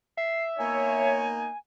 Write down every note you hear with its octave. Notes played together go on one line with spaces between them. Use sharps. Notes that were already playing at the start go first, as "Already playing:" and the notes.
E5 C7
A#3 B3 D#4 C#5 G#5